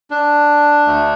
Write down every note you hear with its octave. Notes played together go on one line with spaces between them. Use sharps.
D4
D2 D3 A3